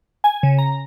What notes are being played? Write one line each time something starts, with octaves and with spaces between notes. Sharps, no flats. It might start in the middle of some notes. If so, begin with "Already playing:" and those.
G#5
C#3
A#5